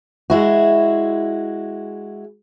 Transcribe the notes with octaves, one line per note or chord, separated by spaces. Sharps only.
G#3 E4 F#4